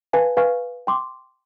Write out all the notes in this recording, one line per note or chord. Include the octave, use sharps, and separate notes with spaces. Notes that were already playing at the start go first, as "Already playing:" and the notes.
B4 F5 G#5 A5
B4 F5 G#5 C#6 F6
G5 C6 D6